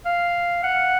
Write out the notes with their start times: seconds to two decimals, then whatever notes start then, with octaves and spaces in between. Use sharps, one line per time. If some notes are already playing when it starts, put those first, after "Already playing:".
0.05 F5
0.63 F#5